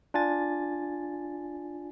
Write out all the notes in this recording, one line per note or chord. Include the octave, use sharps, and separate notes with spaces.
D4 F4 G#5 A6